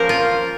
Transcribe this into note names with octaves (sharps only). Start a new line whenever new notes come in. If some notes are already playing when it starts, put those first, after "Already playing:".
Already playing: F3 A#3 C#4 A#4 C5
F4